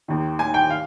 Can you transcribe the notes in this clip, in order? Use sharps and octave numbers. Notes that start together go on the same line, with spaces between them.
D#2 D#3
G#5
G5
F5